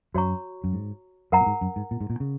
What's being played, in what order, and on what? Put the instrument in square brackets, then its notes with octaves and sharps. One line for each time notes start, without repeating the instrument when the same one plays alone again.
[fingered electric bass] F#2 [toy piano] F#4 C#5 A#5 C#6
[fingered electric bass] F#2
G#2
[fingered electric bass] F#2 [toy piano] A#4 F#5 A#5
[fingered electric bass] A#2
G#2
F#2
G#2
A#2
G#2
A#2
C#3